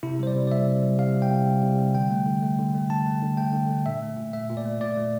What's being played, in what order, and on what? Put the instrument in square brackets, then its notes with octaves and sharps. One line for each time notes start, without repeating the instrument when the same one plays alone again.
[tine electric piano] C3 E4
G3 C5
D5
C3
D5
G3 E5
C3
G3
C3 F5
G3
G5
C3
G3
C3
G3
D3 G5
A3
D3
A3
D3
A3
D3 A5
A3
D3
A3 G5
D3
A3
A#2 E5
A3
A#2
A3 E5
A#2
D5
A3
A#2 D5
A3